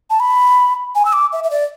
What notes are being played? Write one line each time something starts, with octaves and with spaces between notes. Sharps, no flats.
A5
B5
G#5
E6
D6
E5
E5
D5